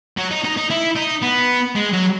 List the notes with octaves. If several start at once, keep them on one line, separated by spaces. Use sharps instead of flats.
F#3
D#4
D#4
D#4
E4
D#4
B3
G#3
F#3